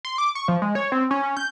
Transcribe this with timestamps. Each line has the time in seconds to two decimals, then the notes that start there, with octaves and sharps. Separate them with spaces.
0.05 C6
0.18 D6
0.35 C#6
0.48 F3
0.62 G#3
0.75 C#5
0.92 C4
1.11 C#4
1.23 C#4
1.37 G6